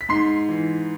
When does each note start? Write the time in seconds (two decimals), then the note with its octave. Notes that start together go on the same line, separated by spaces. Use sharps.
0.01 B6
0.09 G#2 C6 C7
0.49 E3